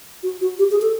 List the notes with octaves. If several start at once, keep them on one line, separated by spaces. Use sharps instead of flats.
F#4
F#4
G4
G#4
A4